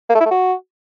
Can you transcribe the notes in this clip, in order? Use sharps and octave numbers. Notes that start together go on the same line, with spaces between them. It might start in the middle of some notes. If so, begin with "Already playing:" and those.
A#3
A3
E4
A3
F#4